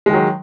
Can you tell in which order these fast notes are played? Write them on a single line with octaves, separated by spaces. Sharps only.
G#3 D#3 F#3